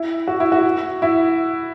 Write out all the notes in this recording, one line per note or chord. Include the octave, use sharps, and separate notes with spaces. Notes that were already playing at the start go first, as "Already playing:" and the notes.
Already playing: E4
F#4
E4
F#4
E4